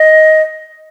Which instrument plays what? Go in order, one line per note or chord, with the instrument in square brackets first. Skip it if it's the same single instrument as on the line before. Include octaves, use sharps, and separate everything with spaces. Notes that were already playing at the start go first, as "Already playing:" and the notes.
Already playing: [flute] D#5